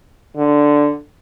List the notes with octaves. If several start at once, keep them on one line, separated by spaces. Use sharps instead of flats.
D3